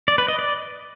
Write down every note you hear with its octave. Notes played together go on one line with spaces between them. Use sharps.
D5
B4
D#5
D5